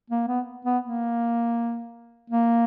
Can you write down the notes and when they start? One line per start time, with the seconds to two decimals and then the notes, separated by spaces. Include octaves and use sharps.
0.10 A#3
0.28 B3
0.65 B3
0.83 A#3
2.30 A#3